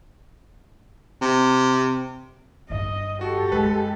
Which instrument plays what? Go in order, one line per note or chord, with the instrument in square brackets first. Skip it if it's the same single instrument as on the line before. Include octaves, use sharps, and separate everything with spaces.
[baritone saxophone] C3
[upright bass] G1 G2 [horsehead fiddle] D#5
[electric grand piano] F#4 [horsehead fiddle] G4 A4
[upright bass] F#2 [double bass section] G#3 [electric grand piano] B4